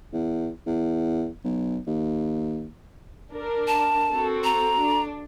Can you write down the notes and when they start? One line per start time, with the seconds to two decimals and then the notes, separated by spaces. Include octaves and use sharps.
0.13 E2
0.66 E2
1.44 B1
1.86 D#2
3.32 D4 A#4
3.68 A5
4.10 C4 F#4 A4
4.44 A#5
4.79 D4